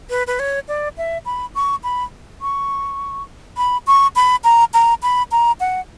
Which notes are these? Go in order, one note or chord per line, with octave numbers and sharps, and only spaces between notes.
B4
B4
C#5
D5
E5
B5
C#6
B5
C#6
B5
C#6
B5
A#5
A#5
B5
A#5
F#5